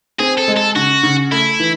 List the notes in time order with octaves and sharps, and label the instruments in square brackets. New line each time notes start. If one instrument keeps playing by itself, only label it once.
[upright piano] C4 [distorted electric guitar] G#4
[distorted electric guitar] A4
[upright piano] G#3
[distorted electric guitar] A4
[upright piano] C#3 [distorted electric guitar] F#4
[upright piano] C#3
[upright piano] A3 [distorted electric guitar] E4
[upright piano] E3